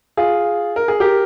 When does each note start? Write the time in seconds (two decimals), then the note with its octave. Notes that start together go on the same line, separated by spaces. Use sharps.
0.17 F4 G#4
0.76 A#4
0.88 G#4
1.00 G4 A#4